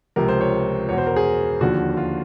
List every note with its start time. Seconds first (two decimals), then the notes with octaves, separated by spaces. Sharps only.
0.16 C#2 C3 F3 A#4
0.28 C5
0.41 C#5
0.89 E2 B2 C#5
0.98 C5
1.07 A#4
1.16 G#4
1.61 D#2 D3 F3 F#4
1.97 F4